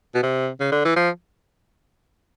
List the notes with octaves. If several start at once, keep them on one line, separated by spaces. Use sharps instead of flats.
B2
C3
C#3
D3
E3
F3